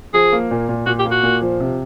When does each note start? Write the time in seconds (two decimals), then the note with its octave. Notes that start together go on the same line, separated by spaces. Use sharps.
0.13 F3 G#4
0.33 A#3
0.51 A#2
0.69 A#2
0.86 A#2 F#4
0.99 G4
1.05 A#3
1.11 F#4
1.23 A#2
1.42 F3
1.60 C3